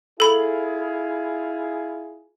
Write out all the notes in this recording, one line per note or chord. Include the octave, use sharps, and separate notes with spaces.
E4 F4 G#4 A4 B5